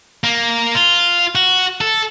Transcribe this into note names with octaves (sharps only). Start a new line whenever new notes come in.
A#3
F4
F#4
A4